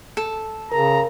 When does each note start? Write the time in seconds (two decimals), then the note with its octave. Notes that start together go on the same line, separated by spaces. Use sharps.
0.17 A4
0.72 C#3 A#4 A#5